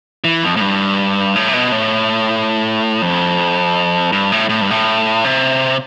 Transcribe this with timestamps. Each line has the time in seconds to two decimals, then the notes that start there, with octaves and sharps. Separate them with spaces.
0.24 E3
0.42 F2
0.56 A2
0.61 G2
1.36 A2
1.48 C3
1.53 B2
1.72 A2
3.02 F2
4.12 G2
4.32 A2
4.49 A2
4.61 G2
4.71 A2
5.24 C3